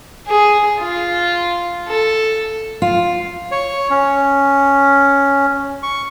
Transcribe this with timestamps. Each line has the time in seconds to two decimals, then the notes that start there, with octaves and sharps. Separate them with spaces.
0.27 G#4
0.79 F4
1.88 A4
2.82 F4
3.52 C#5
3.90 C#4
5.83 C#6